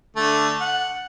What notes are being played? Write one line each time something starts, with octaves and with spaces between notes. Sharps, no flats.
D3 A3
F#5